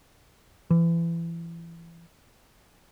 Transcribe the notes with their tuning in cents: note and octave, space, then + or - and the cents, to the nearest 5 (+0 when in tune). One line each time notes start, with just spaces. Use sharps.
E3 +30